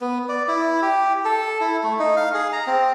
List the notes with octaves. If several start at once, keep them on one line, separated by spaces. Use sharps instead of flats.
B3
D5
E4
G4
A4
E4
A3
D#4
F5
G#4
A#5
C4